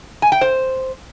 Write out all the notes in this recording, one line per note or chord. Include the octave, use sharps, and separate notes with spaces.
G#5
G5
C5